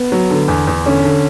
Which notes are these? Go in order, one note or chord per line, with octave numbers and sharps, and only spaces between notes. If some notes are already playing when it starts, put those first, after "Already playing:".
Already playing: B3
F#3
D3
E2
E2
D3 C#4
D3